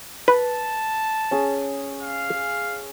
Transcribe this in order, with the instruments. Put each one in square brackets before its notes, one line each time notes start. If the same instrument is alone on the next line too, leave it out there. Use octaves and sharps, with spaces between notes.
[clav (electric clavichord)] B4 [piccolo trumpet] A5
[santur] C#4 G#4
[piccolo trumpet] F5